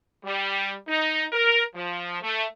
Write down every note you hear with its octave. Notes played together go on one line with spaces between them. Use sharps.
G3
D#4
A#4
F3
A3